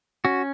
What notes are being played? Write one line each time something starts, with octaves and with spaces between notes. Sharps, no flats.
C#4 F#4